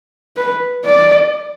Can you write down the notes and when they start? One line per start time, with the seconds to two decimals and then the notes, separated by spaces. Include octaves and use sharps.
0.37 B4
0.85 D5